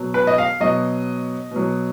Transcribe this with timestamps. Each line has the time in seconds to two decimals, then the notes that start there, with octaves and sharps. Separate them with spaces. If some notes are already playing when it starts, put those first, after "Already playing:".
Already playing: B2 F#3
0.14 B4
0.27 D#5
0.38 F5
0.60 B2 F#3 D#5
1.51 B2 F#3